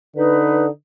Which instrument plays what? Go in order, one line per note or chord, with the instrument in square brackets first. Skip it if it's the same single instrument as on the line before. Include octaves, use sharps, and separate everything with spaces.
[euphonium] D3 [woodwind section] D#4 B4